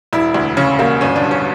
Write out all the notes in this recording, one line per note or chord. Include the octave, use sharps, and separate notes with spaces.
E1 E4
D2
C#3 C#4
E1 A#3
G1 C#4
D4
G2
C#4